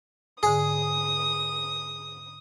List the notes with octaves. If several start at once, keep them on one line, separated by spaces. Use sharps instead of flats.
G#2 D3 G#4 D#6